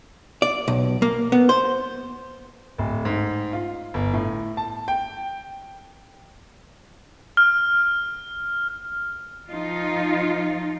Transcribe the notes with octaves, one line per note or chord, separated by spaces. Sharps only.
D5
B1
A#3
B3
C5
D1
G#2
F4
G1
A2
A5
G5
F6
F3 D#4 F4